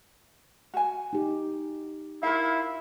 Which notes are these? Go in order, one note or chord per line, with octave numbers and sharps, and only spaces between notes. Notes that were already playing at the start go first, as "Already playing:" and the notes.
F#4 G#5
D#4 G4
E4 F4 A#4 F5